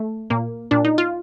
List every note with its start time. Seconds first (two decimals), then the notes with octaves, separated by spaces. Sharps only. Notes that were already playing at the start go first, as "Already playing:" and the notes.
Already playing: A3
0.30 A#2 A#3
0.71 A#2 D4
0.85 D#4
0.98 F4